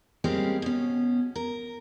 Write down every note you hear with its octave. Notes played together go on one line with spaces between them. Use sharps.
G3 G#3 A#3 C4 C#4 G4
B2 C#4
A#4